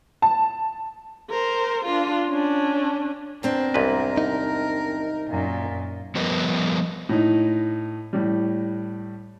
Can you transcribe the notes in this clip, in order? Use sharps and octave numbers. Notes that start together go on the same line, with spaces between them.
A5
A#4 C5
D4 F4
C#4 D4
E2 C4 D4 A#4
C2 G#2 B4
D#4
F#2 A#2
F3 G3 B3 A#4 B4 D#5
A2 D#4
A2 G3